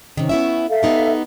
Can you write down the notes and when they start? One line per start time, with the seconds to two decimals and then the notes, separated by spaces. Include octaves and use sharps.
0.17 C3 D#3 C#4
0.29 B3 E4 E5
0.69 A4 E5 F5
0.83 B3 D#4 G4